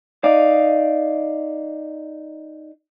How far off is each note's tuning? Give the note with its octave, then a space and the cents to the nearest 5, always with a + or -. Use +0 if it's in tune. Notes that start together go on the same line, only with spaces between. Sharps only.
D#4 +0 D5 +0 F5 +0